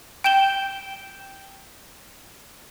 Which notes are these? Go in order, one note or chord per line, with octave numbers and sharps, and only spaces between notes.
G5 G6 E7 G7